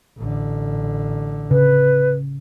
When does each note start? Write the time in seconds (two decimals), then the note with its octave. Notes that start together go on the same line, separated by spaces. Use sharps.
0.18 A1 D3
1.51 C#3 B4